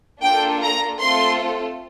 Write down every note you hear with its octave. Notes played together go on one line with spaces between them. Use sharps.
A#3 D4 F4 A4 G5
A#5
A3 C4 F4 A4 C6